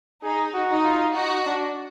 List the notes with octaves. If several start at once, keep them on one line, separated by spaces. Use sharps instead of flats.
D#4 G#4
F#4
D#4
F4
D#4 F#4
D4